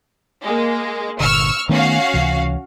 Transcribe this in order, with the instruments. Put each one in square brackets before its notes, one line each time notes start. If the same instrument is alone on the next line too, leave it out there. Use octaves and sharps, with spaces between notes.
[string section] G#3 A#3
[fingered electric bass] G1 A#2 D3 [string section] C#6 E6 F6
[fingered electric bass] D#3 A3 B3 [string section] C#4 F#4 F5
[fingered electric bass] C#2 C3 E3